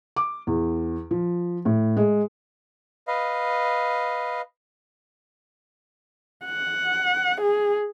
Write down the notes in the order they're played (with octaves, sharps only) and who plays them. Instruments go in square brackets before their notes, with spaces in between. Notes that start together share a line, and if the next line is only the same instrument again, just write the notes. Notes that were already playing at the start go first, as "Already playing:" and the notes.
[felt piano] D6
E2
F3
A2
G#3
[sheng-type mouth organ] B4 D#5 F5
[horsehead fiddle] F#5
G#4